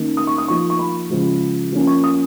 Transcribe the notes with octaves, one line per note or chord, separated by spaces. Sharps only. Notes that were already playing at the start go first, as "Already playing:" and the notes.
Already playing: D#3 A#3 C#4
D#6
C#6
D#6
F3 A#3 D#4 C#6
C#6
B5
C#3 F3 G#3
F3 A#3 C#4
C#6
D#6